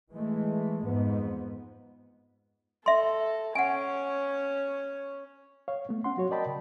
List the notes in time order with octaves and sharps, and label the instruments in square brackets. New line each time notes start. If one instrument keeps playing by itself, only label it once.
[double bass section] E3 G#3 A3
F2 G#2 B3
[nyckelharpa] A4 [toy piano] E5 C6
[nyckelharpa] C#4 C#5 [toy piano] F#5 G#5
[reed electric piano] C#5 F5
A3 B3
C#4 F#5 C6
F#3 F#4 C#5
A#4 D5 D#5 G5 A5 B5
C#3